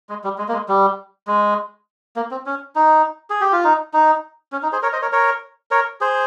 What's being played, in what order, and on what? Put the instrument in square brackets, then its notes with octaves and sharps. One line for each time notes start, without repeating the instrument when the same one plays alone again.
[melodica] G#3
G3
G#3
A#3
G#3
G3
G#3
A#3
C4
C#4
D#4
G#4
G4
F4
D#4
D#4
C#4
D#4
G#4 C5
A#4 C#5
C5 D#5
A#4 C#5
A#4 C#5
A#4 C#5
G#4 C5